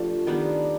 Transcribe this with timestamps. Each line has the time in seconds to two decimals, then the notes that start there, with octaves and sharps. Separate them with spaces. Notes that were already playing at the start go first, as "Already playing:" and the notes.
Already playing: F3 A3 D4 G4
0.27 D#3 G3 B3 D4